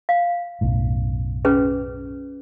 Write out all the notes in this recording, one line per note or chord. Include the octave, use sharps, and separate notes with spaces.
F5
B1 F#2 A2
C#4 G#4 B4